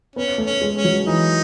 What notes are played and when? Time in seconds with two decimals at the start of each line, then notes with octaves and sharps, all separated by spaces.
0.16 B3 C#4
0.38 A3
0.46 C#4
0.61 G#3
0.77 C#4
0.85 F#3
1.07 E3 D#4